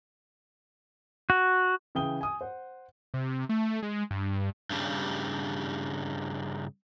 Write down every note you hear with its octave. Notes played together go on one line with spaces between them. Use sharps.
F#4
C#3 E3 G5 D#6 G7
G#5 D#6
C5 F#5
C3
A3
G#3
G2
G2 C#3 G3